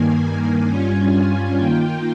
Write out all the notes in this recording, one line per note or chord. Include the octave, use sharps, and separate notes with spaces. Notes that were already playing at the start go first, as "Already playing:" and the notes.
Already playing: G2 D#3 A#3 G#5
G#5
G2 G3 C#4 F4
D#3 A#3 F4 G5